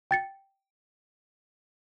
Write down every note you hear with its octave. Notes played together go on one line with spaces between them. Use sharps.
G5 A6 C#7